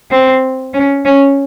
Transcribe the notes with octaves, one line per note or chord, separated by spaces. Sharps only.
C4
C#4
C#4